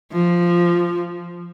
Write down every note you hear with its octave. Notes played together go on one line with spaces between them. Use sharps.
F3